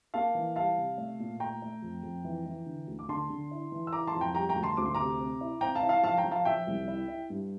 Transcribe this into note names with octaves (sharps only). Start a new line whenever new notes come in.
A#3 F5 A5
E3
G3 F5 A5
C3
A3
A#2
A3 G5 A#5
A3
F2
F2
E3
E3
D3
D2
D6
D3 A5 C6
D3
E4
E3
E6
E4 A#5 D6
A5 C6
F2
G5 A#5
G3 G5 A#5
G5 A#5
D2
A5 C6
D2 D6
C6
C3 A#5 D6
C4
E4
C4 G5 A#5
F5 A5
E4
F5 A5
F3 F5 A5
G5 A#5
F3
F5 A5
F3 E5 G5
C2
E4
E4
G2